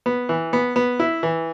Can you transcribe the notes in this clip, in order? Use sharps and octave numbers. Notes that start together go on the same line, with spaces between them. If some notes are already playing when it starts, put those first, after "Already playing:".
B3
E3
B3
B3
E4
E3